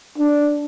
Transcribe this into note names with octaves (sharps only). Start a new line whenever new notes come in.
D4